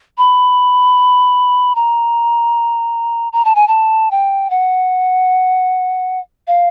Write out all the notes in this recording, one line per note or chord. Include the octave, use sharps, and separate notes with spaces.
B5
A#5
A#5
A5
G#5
A5
G5
F#5
F5